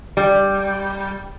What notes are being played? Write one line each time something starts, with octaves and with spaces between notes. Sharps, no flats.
G3